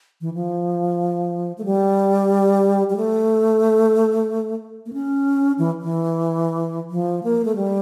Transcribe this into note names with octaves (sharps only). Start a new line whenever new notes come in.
E3
F3
A3
G3
G3
A3
A#3
C#4
E3
E3
F3
A#3
A3
G3